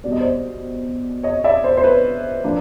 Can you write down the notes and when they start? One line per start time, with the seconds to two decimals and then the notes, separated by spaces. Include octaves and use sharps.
0.03 B2 G3 A#3 D5
0.12 D#5
0.20 C5 D5
1.23 C#5 D#5
1.44 D5 E5
1.64 C5 D5
1.77 C5
1.84 B4 C#5
2.44 F3 A#3 D4